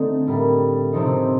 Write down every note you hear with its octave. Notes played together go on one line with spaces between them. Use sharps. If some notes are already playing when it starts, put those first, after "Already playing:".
Already playing: D3 A3 C4 D#4
A2 G3 A#3
C3 F3 C4 D#4